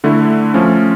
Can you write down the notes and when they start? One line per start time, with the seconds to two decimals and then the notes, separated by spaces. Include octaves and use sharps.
0.04 D3 A3 E4
0.54 F3 A3 C#4